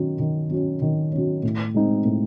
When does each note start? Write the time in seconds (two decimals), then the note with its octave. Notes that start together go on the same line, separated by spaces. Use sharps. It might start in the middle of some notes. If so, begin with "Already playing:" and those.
Already playing: D#3 F#3 C#4
0.20 D#3
0.51 F#3 C#4
0.82 D#3
1.13 F#3 C#4
1.43 A2
1.74 G#3 C4 D#4
2.05 A2